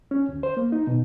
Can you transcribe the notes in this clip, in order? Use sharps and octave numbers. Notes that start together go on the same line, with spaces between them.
C#4
D2
C5
A#3
D#4
B2